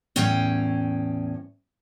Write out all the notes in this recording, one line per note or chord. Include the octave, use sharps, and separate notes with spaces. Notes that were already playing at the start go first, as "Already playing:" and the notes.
E2 A2 C#4 G5